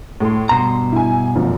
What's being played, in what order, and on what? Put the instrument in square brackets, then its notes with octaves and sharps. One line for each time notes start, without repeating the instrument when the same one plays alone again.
[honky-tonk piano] A2 A3 C6
[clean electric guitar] G2 B2 A#5 [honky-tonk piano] C6
[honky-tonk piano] E4 G#5
F1 F#2 F3